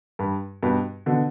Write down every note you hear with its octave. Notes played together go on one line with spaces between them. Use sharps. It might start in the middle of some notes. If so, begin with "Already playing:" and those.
G2
G2 B2
B2 D3